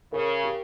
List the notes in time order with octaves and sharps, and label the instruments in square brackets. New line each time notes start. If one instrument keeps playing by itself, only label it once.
[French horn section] C#3 [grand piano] A#4
[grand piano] G4